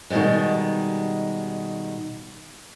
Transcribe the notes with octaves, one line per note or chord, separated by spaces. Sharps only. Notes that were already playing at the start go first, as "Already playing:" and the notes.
B2 D#3 E3 G3 G#3